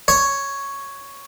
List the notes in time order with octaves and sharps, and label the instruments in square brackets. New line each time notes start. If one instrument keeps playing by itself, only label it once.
[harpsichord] C#5